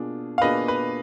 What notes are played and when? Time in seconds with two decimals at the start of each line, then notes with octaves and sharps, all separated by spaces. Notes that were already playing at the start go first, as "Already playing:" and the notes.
Already playing: B2 A#3 D4 F4 G#4
0.38 F5
0.41 B2 A#3 D4 F4 G#4 B4 D#5
0.68 B4